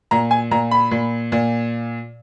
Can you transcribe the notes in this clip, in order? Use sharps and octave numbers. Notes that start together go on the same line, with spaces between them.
A#2 A#5
G#5
A#2 A#5
B5
A#2
A#2